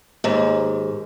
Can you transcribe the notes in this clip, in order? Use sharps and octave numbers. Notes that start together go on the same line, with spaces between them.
D#2 G#2